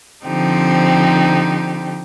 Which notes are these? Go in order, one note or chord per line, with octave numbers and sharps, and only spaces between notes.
D3 F3 C4 D#4 G4